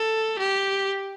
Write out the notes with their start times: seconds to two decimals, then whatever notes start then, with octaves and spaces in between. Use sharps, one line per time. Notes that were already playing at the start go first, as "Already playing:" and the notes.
Already playing: A4
0.39 G4